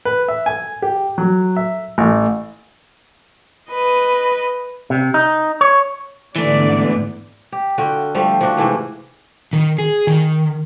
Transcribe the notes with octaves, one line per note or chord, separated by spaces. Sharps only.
B4
E5
G#5
G4
F#3
E5
A1
B4 D#5
C3
D#4
C#5
G#2 D3 E3 A3 B3 D5
G4
D3 F4 F#4 G5
F3 G3 A3 F5
F3 D4 F#4
G#2 C3 E3 A3
D#3
G#4
D#3